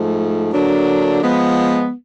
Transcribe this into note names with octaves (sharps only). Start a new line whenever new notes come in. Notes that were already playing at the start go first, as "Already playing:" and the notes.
Already playing: G#2 F3 A3
D3 F#3 A#3 D4
F3 G#3 B3